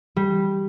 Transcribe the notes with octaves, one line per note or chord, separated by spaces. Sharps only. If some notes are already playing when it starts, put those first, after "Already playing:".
G3